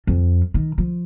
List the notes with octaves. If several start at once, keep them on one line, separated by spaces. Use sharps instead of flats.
F2
D#3
F3